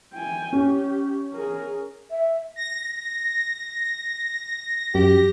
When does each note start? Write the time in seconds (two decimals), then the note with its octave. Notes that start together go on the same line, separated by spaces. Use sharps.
0.13 G5 G#5
0.53 C#4 G4
1.33 G#4 A#4
2.11 E5
2.56 A#6
4.95 F#2 G4